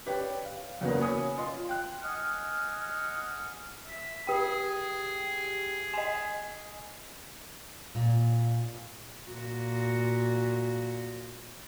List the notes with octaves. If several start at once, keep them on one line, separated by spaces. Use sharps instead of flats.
G4 B4 C#5 D5 G5
F5
E2 C#3 F#3 A#3 B3
C#5 G#5 B5 D#6
F4 D#5 C6
G5 F#6
D#5 F#5 G#5 D#6 F6
E5
G4 G#4 G5
D#5 G#5
A#2
A#2 F#4